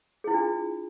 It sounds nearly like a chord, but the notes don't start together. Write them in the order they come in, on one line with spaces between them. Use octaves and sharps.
G#4 E4 F4 D4